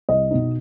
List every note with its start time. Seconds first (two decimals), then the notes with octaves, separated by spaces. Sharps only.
0.09 C2 D#5
0.31 B2 B3 D#4